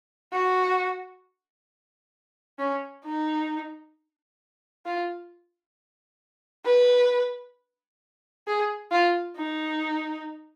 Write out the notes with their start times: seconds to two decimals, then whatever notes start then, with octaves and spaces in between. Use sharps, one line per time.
0.33 F#4
2.59 C#4
3.04 D#4
4.85 F4
6.66 B4
8.47 G#4
8.92 F4
9.37 D#4